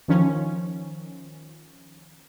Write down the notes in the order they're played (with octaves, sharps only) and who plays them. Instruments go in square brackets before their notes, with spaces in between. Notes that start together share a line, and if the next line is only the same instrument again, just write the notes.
[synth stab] D#3 F3 C#4